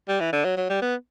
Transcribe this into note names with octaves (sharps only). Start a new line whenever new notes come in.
G3
E3
D3
F#3
F#3
G3
B3